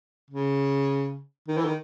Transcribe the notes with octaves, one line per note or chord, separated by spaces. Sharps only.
C#3
D#3
E3
D#3